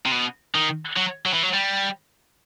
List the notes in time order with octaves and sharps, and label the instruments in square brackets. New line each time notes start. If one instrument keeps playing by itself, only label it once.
[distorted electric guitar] C3
B2
D#3
F#3
F#3
E3
F#3
G3